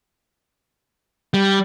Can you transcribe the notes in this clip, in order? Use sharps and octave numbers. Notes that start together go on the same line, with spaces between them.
G3